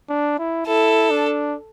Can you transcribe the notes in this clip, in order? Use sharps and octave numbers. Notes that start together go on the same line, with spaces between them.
D4
E4
E4 A4
D4